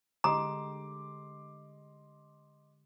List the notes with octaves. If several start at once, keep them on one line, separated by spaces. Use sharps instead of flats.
D3 G#3 G4 D#5 A#5 C6 D6